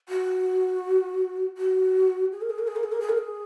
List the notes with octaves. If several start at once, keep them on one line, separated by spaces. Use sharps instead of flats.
F#4
F#4
G#4
A#4
G#4
A#4
G#4
A#4
G#4
A#4
G#4
A#4
G#4